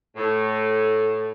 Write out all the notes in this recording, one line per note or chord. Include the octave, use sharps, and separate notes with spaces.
A2